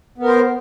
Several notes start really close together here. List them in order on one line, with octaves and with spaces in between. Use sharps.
B3 A#4 C5